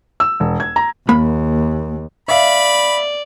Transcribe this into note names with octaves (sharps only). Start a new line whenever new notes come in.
E6
E1
G#6
A#5
D#2 A#3 B5
D5 E5 F5 B5